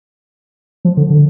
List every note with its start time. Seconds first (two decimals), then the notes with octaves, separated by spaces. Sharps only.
0.85 F3
0.97 D3
1.10 D3